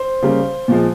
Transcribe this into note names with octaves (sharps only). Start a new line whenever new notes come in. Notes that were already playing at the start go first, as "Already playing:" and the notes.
Already playing: C5
C#3 G3 A#3
A#2 F3 G#3